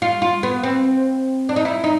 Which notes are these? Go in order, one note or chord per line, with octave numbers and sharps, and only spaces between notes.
F4
F4
B3
C4
D4
D#4
E4
D#4